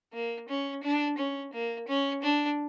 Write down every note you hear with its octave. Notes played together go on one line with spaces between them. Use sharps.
A#3
C#4
D4
C#4
A#3
C#4
D4